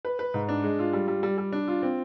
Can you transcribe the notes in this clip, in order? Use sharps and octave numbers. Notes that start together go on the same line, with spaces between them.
B4
B4
G#2
D4
G#3
F4
G3
G3
G3
G3
D4
F4
C4